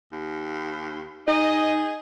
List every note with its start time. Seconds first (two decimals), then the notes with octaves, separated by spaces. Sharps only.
0.12 D#2
1.28 D#4 G#4 D#5